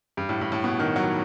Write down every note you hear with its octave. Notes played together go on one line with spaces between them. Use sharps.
G2
A2
A2
A2
B2
D#3
F#3